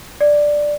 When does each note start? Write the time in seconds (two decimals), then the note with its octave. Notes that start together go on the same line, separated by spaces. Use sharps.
0.21 D5